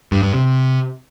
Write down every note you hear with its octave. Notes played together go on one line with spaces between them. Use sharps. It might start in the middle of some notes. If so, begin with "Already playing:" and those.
G2
G2
C3